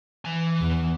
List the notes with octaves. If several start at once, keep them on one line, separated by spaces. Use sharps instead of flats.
E3 G#5
E2